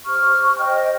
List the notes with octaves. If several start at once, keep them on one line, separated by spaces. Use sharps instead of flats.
G4 C5 C#6 F6
G4 C5 D#5 G5